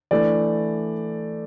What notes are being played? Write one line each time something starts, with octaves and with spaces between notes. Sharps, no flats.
E3 A3 D4 D5